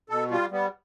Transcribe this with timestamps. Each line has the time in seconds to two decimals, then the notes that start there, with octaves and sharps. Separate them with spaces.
0.09 B2 A4
0.31 G3 F4
0.51 G3 B3